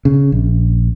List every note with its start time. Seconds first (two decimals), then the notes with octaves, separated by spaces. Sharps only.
0.05 C#3
0.32 A#1